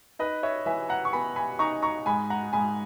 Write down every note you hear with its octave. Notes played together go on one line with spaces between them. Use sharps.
D#4 B4 D#5
C#5 E5
E3 E5 G#5
F#5 A#5
C#6
B3 G#5 B5
G#5 B5
D#4 A#5 C#6
A#5 C#6
G#2 G#5 B5
F#5 A#5
G#2 G#5 B5